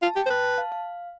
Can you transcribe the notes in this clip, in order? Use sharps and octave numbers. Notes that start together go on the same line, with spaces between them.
F4 A5
G4 G5
C5
B4 A5
A5
F5
F5